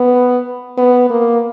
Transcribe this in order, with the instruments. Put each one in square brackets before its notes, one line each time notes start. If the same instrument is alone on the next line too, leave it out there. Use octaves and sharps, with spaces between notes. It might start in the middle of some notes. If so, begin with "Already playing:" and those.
Already playing: [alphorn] B3
B3
A#3